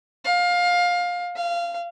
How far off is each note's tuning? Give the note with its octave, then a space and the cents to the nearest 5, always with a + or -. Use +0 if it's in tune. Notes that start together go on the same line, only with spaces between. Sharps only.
F5 +20
F5 -20